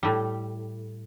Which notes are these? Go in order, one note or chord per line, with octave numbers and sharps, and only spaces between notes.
A2 G3